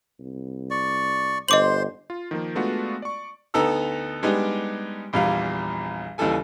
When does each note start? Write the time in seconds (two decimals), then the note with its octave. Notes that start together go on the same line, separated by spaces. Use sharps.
0.19 C2
0.71 D5 C#6
1.49 G1 C5 D#5 C6 D6 F#7
2.10 F4
2.31 D#3 F3 A#3
2.55 G#3 A3 B3 D4 F4 F#4
3.02 D5 C#6
3.54 D2 B3 D#4 A4 A#5 E6
4.23 G3 G#3 B3 D4 D#4 G4
5.13 A#1 E2 G3 F4 F5
6.18 D#2 C#3 E3 G3 A4 G#5